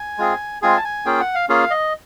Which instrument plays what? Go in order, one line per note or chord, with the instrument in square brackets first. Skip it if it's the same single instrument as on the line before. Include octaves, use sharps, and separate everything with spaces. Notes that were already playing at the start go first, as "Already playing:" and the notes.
Already playing: [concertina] G#5
G#3 C4 F4 G#4
G#3 C4 F4 G#4 G#5
A5
G#5
A#3 C#4 F4 G#4 G5
F#5
F5
A#3 C#4 F4 G#4 F5
D#5